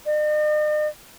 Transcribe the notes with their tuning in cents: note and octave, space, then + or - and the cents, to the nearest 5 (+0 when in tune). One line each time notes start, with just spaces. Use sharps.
D#5 -45